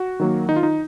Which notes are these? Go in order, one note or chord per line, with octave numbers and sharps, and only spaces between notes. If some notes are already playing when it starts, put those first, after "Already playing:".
Already playing: F#4
D#3 F#3 A#3
D#3 D#4
F4
D#4